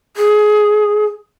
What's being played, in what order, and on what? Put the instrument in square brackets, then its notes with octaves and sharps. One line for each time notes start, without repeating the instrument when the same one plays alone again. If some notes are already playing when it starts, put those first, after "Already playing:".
[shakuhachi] G#4